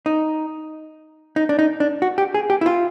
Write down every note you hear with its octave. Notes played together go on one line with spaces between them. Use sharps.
D#4
D#4
D4
D#4
D4
F#4
G4
G#4
G4
E4
F4